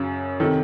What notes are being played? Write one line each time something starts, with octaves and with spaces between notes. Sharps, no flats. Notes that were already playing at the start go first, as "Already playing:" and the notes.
Already playing: F#2 C#3
C3 D#3 A4